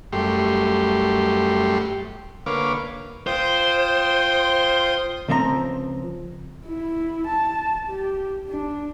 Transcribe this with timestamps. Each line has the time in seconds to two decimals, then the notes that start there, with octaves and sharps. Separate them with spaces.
0.13 F#2 G3 A3 G4 C6
2.46 D3 A#3 B4 C#5 F5 D6
3.27 F4 C5 G5 D#6
5.28 C#2 F3 C4 D#5 A#5
6.67 E4
7.27 A5
7.88 G4
8.49 D4